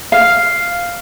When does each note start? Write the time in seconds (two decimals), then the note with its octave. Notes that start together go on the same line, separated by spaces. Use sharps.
0.12 F5